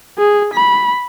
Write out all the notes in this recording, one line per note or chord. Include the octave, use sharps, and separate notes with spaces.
G#4
B5